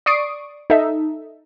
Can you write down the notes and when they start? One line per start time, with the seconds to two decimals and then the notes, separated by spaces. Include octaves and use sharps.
0.06 D5 C#6 D#6 C7 D7
0.70 D#4 A4 E5